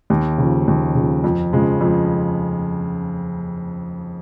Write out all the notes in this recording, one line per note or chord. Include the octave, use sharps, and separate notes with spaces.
D#2
C#3 F3
D#2
C#3 F3
F2
C#3 F3 G#3
F2